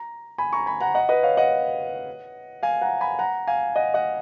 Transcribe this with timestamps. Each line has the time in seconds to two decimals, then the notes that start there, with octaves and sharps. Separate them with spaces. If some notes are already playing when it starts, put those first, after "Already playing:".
Already playing: A#5
0.38 G#5 B5
0.53 A#5 C#6
0.66 G#5 B5
0.80 F#5 A#5
0.95 D#5 F#5
1.09 B4 D#5
1.23 C#5 F5
1.37 D#5 F#5
2.63 F5 G#5
2.82 F#5 A#5
3.01 G#5 B5
3.19 F#5 A#5
3.47 F5 G#5
3.76 D#5 F#5
3.94 D#5 F#5